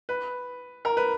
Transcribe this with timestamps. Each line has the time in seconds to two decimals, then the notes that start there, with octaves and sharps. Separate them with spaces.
0.09 B4
0.85 A#4
0.97 B4